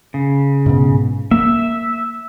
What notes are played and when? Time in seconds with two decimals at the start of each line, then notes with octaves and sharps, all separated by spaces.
0.14 C#3
0.66 G#2 B2
1.31 A#3 E5